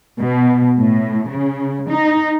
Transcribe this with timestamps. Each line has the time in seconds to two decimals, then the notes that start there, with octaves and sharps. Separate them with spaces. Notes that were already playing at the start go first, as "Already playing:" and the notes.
0.21 B2
0.78 A2
1.29 C#3
1.90 D#4